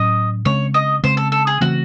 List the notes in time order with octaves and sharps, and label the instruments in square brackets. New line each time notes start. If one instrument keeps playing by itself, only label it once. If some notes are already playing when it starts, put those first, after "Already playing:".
Already playing: [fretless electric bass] A2 F#3 C#4 [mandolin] D#5
[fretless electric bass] C#3 G#3 C4 [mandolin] C#5
[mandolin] D#5
[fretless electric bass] C#3 G#3 C4 [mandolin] C5
[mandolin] A4
A4
G#4
[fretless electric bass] C#3 E3 A3 C4 [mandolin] F#4